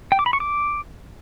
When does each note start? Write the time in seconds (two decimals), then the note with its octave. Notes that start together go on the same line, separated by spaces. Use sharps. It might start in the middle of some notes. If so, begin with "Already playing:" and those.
0.12 G5
0.19 D6
0.26 B5
0.33 C#6
0.40 D6